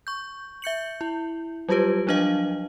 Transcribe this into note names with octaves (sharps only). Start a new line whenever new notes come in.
C#6 G6
E5 G6 C#7 F#7
E4
F#3 G3 F4 G4 B4
F3 F#3 D4 D#5 F5